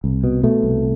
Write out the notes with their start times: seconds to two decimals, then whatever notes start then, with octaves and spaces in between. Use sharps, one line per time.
0.04 C2
0.24 B2
0.43 B2 A3
0.63 C2